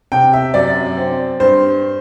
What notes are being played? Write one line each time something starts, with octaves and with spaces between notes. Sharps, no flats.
C3 G5
E5
F#2 D5
C4
G2 C5